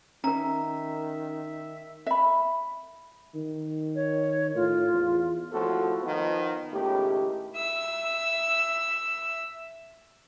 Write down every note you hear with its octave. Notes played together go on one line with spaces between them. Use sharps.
D#3 C#4 A#4 E5 A#5
E5 B5
D#3
C#5
A2 F4
E2
G#1 A2 F3 F#4 A4
D#3 F3 B3
C#2 A2 D#3 G4
E5 E6